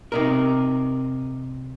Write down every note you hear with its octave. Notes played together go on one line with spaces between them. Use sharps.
C3 D#4 A#4